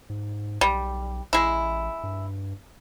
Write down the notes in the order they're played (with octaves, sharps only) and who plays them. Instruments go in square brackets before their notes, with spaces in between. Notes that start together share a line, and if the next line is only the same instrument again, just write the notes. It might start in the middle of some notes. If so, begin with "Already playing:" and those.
[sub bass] G#2
[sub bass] B1 [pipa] G3
[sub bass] A1 [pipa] G#3 E4
[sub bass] G2